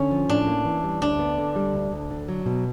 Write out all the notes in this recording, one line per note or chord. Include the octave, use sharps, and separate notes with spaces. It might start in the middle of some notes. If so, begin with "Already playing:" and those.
Already playing: D3 C#4
F3
A2 D4
A#3
E3
G3
D2 D4
B3
D3
G3
D2
D2
D3
F#3
B2